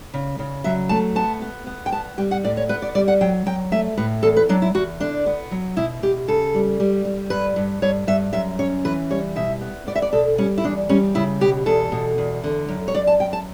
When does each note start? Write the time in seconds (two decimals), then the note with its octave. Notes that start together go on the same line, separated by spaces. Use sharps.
0.14 C#3
0.39 C#3
0.64 F#3 E5
0.89 A3 A5
1.15 B3 A5
1.42 B3
1.67 B3
1.86 G5
1.92 B3 A5
2.18 G3 G5
2.31 F#5
2.44 A2 D5
2.57 C#5
2.69 B3 B4
2.82 D5
2.95 G3 D5
3.08 F#5
3.21 F#3 G5
3.46 F#3 G5
3.72 A3 E5
3.97 A2 B4
4.23 E2 A4
4.37 B4
4.49 F#3 D4
4.62 E4
4.74 E2 F#4
5.00 D3 D4
5.26 B3
5.51 F#3
5.77 B2 E4
6.03 B2 G4
6.28 C#3 A4
6.55 G3
6.80 G3
7.05 G3
7.30 G2 B4
7.56 G2
7.82 G2 C#5
8.07 G2 E5
8.33 F#2 E5
8.59 C#4 C#5
8.85 E3 B4
9.10 G3 C#5
9.36 B2 E5
9.61 B3
9.87 B3 D5
9.95 E5
10.02 D5
10.13 B2 A4
10.38 G3 C#4
10.58 E4
10.64 E2 D4
10.89 G3 C#4
11.15 C#3 E4
11.41 B2 G4
11.66 E2 A4
11.92 B2
12.18 E2
12.44 D3
12.69 F#2
12.88 C#5
12.95 F#2 D5
13.07 A5
13.20 F#2 G5
13.33 A5